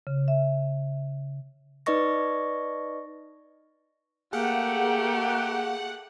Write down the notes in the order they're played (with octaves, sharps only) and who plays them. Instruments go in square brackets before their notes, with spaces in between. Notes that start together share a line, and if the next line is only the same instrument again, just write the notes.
[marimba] C#3
E5
[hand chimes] D#4 B4 D5 D#5 C#6 A#6
[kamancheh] A3 G4 [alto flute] A#3 [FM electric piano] G#4 F5 [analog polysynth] F#5